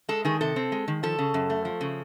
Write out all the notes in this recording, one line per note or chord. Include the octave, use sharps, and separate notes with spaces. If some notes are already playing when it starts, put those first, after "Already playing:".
G#3 A4
D#3 G#4
C3 A4
C4
G#3
D#3
F3 A4
C#3
F#2
A3
F3
C#3